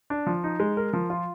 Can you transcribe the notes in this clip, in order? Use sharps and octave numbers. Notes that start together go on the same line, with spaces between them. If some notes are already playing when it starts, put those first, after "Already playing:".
D4
F3
D#4
G#3
A#4
F3
F4